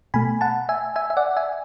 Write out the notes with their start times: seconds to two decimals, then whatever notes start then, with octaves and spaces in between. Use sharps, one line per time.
0.14 B2 A3 G#5 B5
0.41 F#5 A5
0.69 E5 G#5
0.96 E5 G#5
1.10 E5
1.17 D5 F#5
1.37 E5 G#5